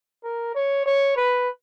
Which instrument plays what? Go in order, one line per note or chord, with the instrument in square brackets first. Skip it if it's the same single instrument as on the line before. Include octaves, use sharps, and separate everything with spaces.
[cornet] A#4
C#5
C#5
B4